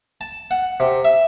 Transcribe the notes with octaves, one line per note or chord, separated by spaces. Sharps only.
A5
F#5
C3
E5